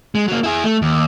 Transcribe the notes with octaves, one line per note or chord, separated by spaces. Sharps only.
G#3
F#3 A#3
E4 G#4
A3
D#2